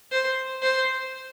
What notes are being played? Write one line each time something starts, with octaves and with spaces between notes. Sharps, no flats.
C5
C5